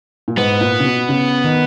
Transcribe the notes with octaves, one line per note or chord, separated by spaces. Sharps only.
A#2
G#2 B3
A#2
C#3
B2
C#3
D#3